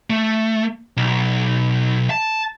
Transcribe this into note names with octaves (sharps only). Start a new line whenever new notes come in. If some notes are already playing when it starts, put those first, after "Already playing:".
A3
B1
A5